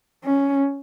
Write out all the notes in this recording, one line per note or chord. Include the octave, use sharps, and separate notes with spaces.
C#4